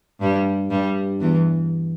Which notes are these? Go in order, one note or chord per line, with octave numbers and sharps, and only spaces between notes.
G2 G3
G2 G3
E2 E3